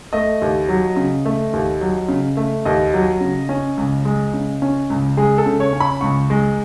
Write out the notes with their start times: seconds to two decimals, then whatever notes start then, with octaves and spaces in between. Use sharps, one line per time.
0.13 A3 D#5
0.42 D#2
0.69 F#3
0.96 C#3
1.26 A3
1.53 D#2
1.81 F#3
2.09 C#3
2.37 A3
2.65 D#2 D#5
2.94 F#3
3.21 C#3
3.49 C#4
3.77 C#2
4.05 G#3
4.34 C#3
4.62 C#4
4.90 C#2
5.17 G#3 G#4
5.38 A4
5.46 C#3
5.60 C#5
5.73 C#4
5.80 B5
6.01 C#2 C#6
6.30 G#3